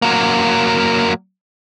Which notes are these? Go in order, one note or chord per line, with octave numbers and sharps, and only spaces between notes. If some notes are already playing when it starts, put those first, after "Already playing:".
F#3 A#3